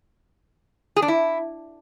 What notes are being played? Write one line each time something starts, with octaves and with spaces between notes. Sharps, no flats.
G#4
D4
E4